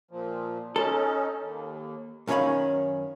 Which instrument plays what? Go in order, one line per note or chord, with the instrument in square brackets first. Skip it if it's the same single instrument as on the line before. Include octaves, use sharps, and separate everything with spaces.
[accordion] A#2 F3
[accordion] C#4 D#4 [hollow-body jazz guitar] A4
[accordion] D#2
[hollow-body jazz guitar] F#2 D#3 C#4 C#5 F5 B5